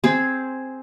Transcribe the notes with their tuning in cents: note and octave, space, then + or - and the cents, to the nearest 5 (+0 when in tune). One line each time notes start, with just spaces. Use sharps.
C4 +0 G#4 +0 C5 +5